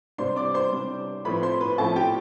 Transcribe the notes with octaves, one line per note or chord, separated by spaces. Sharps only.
C3 G3 D4 C5 C6
D5 D6
C5 C6
C3 G3 D4
A2 F3 C4 B4 B5
C5 C6
B4 B5
A2 F3 C4 A4 A5
G4 G5